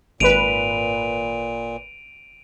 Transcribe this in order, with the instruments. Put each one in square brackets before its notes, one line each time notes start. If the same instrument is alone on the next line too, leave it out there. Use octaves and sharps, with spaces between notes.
[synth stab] G#1 B4 [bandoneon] A#2 [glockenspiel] D7 D#7 F7